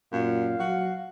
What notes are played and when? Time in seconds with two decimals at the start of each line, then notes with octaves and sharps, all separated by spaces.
0.12 F#2 A#2 F5
0.60 F#3 F#4